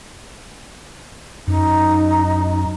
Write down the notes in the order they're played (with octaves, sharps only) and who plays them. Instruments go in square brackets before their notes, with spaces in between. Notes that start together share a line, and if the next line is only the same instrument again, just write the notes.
[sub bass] F#2 [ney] D#4